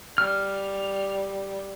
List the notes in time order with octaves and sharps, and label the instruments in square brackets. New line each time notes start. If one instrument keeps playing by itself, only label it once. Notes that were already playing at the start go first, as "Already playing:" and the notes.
[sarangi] G3 [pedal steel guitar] F6